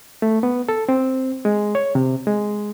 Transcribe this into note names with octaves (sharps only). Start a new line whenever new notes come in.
A3
B3
A4
C4
G#3
C#5
C3
G#3